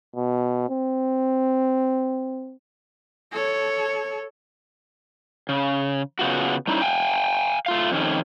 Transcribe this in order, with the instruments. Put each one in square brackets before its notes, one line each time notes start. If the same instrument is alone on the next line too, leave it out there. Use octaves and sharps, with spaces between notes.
[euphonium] B2
C4
[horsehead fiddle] A4 C#5
[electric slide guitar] C#3
C#3 B3 F4 F#4
G3 C#4 D#4 E4
F5 G5 G#5
A3 F4 F5
F2 D#3 C#4